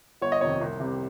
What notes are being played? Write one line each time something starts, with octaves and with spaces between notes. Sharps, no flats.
G1 C#5
D#5
F2 C3 D#3 C#5
C2
C3 G3